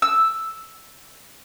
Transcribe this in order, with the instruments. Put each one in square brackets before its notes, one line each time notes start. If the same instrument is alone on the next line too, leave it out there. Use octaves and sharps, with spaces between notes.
[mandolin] E6